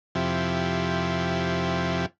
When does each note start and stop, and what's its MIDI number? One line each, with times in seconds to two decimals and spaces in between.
0.15 2.06 41
0.15 2.06 48
0.15 2.06 53
0.15 2.06 64
0.15 2.06 67